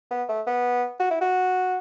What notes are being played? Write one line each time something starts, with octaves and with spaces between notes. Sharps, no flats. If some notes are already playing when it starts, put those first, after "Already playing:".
B3
A3
B3
F#4
E4
F#4